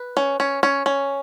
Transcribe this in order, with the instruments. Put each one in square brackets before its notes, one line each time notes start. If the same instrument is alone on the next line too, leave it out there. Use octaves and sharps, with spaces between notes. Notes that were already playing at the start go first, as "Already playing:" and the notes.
Already playing: [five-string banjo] B4
C#4
C#4
C#4
C#4